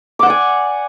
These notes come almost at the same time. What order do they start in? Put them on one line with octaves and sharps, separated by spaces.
D6 F#5 D5 G#5